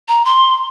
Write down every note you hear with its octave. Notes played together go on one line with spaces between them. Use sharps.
A#5
C6